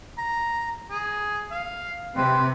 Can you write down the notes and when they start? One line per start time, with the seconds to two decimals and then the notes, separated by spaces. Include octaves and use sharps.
0.18 A#5
0.90 G#4
1.51 F5
2.16 C3 C4 B4